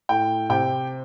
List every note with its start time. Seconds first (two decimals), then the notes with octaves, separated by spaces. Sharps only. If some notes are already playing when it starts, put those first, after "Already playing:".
0.09 A2 G5
0.50 C3 G5